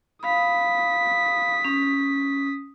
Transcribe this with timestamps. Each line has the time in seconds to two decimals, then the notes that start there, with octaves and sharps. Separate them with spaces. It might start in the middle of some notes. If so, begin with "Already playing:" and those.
0.23 F5 B5 D#6 B6
1.65 C#4